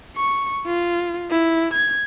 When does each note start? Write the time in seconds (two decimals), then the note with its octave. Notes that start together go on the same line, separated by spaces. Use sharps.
0.17 C#6
0.66 F4
1.31 E4
1.73 G#6